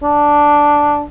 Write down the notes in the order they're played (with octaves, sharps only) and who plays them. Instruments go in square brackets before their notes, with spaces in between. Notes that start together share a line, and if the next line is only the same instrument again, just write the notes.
[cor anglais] D4